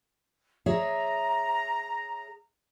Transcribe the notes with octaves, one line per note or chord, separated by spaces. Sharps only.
G#4 C#5 E5 A#5